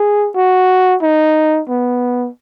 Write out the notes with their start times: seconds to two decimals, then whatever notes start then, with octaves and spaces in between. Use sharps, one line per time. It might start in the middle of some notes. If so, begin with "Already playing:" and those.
Already playing: G#4
0.36 F#4
1.02 D#4
1.69 B3